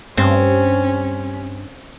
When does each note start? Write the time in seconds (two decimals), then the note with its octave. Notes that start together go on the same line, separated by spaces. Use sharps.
0.18 G2 C4 C#4